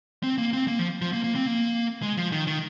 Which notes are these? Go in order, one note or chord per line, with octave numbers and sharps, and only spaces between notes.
C4
A#3
C4
A#3
F3
F3
A#3
A#3
C4
A#3
G#3
F3
D#3
D#3